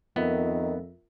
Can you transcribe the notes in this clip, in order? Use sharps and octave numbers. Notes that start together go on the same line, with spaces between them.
F2 D#3 B3 F4 A#4 E5